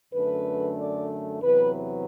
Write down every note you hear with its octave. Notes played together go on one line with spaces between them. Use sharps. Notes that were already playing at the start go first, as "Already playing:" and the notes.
F#2 D3 A3 B4
D5
E2 C3 F#3 B4
B4